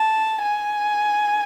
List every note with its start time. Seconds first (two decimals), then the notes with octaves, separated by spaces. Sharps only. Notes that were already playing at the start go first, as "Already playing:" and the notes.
Already playing: A5
0.43 G#5